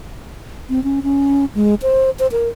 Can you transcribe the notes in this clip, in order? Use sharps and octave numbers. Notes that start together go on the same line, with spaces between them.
C4
C#4
C#4
G#3
C5
C5
A#4